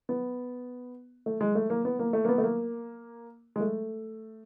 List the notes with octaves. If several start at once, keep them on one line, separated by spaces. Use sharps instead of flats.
B3
A3
G#3
A3
A#3
B3
A#3
A3
A#3
B3
A3
A#3
G#3
A3